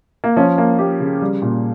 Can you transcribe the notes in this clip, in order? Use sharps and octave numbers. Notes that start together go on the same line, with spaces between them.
A#3
F3 C#4
A#3
A#3 G4
C#3
G3
A#2